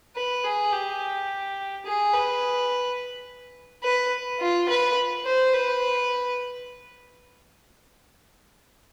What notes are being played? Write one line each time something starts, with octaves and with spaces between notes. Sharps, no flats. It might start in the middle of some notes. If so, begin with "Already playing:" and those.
B4
G#4
G4
G#4
B4
B4
F4
B4
C5
B4